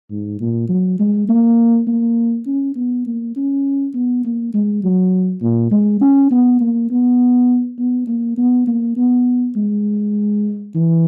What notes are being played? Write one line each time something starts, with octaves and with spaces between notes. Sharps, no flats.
G#2
A#2
F#3
G#3
A#3
A#3
C#4
B3
A#3
C#4
B3
A#3
G#3
F#3
A#2
G#3
C#4
B3
A#3
B3
B3
A#3
B3
A#3
B3
G#3
E3